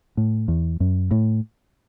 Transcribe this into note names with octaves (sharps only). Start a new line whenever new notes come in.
A2
E2
F#2
A2